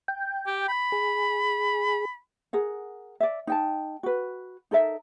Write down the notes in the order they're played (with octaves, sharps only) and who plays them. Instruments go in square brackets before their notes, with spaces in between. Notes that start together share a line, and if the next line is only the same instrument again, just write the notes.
[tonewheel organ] G5
[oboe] G4
B5
[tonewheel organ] G#4
[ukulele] G#4 A#4 F#5
D5 E5
D#4 G5 A5
F#4 B4
D#4 A4 A#4 E5